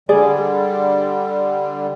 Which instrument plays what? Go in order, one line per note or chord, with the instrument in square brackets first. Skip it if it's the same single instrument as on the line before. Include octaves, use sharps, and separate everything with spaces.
[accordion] D3 G3 [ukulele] G#4 D5